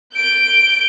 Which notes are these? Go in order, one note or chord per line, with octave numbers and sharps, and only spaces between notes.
G6 D7